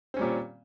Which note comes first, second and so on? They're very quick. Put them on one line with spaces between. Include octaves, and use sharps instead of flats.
C4 C#4 G3 A#2